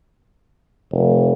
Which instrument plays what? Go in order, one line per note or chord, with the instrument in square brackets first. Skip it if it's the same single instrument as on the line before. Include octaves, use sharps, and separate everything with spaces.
[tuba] F1